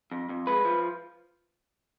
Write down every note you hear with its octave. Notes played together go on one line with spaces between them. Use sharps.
F2
F2
G#3 B4
F3